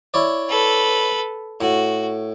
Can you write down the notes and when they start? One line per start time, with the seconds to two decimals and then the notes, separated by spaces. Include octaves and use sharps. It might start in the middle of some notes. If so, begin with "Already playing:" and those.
0.14 E4 C#5 D5
0.49 A4 B4
1.61 A2 F#4